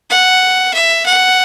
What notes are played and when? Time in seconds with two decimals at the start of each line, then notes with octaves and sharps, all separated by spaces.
0.10 F#5
0.74 E5
1.06 F#5